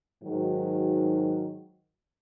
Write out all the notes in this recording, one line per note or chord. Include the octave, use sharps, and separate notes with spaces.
G#2 D#3 F#3 F#4